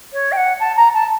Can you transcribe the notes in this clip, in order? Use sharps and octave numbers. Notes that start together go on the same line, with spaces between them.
C#5
G5
F#5
A5
A#5
A5